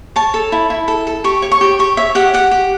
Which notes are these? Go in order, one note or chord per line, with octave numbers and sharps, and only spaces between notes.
C#5 A5
A4
E4
E4
A4
A4
G4 C#6
C#5
C#6
G4
G4 C#6
C#5 E5
G4 F#5
G4 F#5
G4